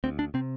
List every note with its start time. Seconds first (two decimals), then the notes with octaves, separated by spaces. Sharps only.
0.04 D2 C4
0.19 D4
0.34 C3 C4